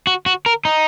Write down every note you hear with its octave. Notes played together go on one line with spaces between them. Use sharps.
F#4
F#4
A#4
D#4